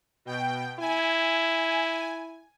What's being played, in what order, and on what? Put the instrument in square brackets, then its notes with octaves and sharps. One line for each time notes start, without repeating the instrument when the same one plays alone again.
[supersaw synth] B2 G5
[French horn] E4 [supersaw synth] G#5